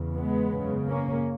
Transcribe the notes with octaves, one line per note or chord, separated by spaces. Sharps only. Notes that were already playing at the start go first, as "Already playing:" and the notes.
Already playing: E2 C#3
G#3 B3
F#2 C#3
A#3 C#4